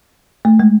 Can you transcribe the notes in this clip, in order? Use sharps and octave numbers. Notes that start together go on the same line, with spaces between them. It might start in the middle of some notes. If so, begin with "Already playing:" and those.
A3
G#3